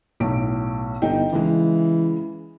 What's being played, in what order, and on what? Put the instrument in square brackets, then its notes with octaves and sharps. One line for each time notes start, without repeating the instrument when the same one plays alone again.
[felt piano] B1 A2 D7
[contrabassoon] G1 [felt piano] D#4 G5
[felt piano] C#3 G#3 [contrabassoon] E3